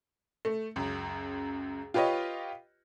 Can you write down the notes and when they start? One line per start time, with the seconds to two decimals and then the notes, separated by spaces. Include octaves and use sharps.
0.45 A3
0.76 C#2 F#2
1.94 F4 G4 B4 C#5 D#5